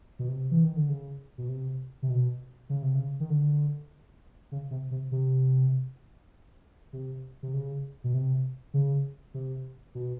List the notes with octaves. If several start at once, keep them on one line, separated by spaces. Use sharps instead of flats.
B2
C3
E3
D#3
D3
C#3
B2
C3
C3
B2
C#3
C3
C#3
D#3
D3
C#3
C3
C3
C3
C3
C3
C#3
B2
C3
C#3
C3
B2